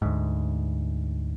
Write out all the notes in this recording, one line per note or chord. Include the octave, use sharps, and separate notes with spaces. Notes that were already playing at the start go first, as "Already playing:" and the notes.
D2 G#2